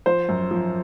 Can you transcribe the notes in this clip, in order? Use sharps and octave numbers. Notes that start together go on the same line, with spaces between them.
F3 C5
F#2
F3